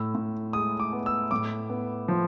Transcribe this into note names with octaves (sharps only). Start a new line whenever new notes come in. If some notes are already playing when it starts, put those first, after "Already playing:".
Already playing: A2 E6
A2
G#3 D#6
D6
B3
E6
A2 D6
B3
F3